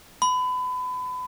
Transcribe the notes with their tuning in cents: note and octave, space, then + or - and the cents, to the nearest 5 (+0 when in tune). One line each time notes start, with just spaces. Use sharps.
B5 +30